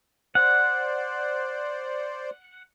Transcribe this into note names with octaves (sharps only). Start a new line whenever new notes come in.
C5 D5 F#5